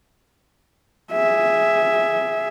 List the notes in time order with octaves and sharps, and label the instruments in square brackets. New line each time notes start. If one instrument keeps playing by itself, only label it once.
[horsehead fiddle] G#4 E5